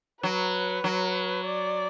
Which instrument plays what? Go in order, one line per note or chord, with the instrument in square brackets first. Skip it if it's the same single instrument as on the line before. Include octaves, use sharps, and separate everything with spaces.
[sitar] F#3 [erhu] B4
[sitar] F#3
[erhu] D5